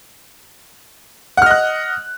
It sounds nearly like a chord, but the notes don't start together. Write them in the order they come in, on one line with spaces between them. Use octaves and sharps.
F#5 F6 D#5 F#6